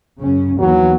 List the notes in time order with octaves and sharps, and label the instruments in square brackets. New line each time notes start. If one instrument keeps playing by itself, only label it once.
[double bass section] F#2 C#3 C#4
[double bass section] D#2 E3 B3 [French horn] F#3